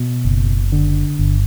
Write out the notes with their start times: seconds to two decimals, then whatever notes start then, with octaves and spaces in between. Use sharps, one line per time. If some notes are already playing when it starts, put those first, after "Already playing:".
Already playing: B2
0.25 F#1
0.72 D3
1.19 G1